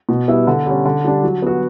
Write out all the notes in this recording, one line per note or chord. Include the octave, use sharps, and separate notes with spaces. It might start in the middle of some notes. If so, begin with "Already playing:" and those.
B2
G3 B3 E4
D3
G3 C#4
D3
G3 D4
F#3
B3 F#4